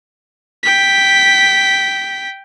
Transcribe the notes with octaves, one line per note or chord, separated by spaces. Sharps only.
G5 B6